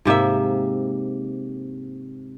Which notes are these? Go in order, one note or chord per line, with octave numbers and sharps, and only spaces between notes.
G#2 C3 A#3 E5